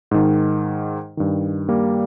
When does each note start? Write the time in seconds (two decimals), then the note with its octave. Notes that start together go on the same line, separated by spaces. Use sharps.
0.11 G#2 D#3
1.17 G2 D#3
1.69 G3 A#3